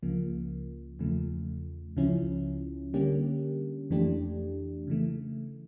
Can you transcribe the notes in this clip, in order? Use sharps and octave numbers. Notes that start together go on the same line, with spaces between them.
C#2 C#3 F3 A#3
E2 C#3 F3 A3
C#2 C#3 F3 C#4 E4
D3 G3 A#3 C#4 G4
F2 E3 A3 D4 G4
C#3 E3 A3